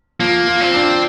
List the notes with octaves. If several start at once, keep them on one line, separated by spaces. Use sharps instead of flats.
F3 A#3
F4
C4
D4